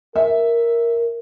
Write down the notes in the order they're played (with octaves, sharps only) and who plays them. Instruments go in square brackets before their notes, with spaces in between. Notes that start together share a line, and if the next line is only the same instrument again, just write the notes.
[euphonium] A#4 [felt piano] E5